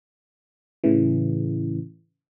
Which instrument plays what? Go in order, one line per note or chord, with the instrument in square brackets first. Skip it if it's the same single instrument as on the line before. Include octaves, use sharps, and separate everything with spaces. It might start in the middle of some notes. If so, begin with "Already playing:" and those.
[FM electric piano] A2 C#3 E3